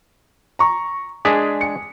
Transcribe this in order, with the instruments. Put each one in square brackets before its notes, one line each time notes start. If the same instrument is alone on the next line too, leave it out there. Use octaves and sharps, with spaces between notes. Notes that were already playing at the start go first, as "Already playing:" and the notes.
[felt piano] A#5 C#6
[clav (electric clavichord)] G#3 D4 G#4 [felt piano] B6
[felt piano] G#5 C#7